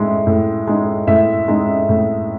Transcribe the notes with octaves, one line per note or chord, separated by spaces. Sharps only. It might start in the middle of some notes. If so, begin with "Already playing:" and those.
Already playing: A2 G#3 D#4 E5
A2
G#3 D#4
A2 E5
G#3 D#4
A2